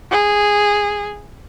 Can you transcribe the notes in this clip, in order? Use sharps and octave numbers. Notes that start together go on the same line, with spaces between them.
G#4